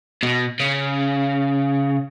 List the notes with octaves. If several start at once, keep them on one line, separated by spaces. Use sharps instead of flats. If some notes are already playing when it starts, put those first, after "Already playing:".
B2
C#3